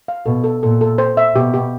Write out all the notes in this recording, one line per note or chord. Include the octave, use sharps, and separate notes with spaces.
F5
B2 A4
A4
A#2 A4
A4
C5
E5
B2 G4
G4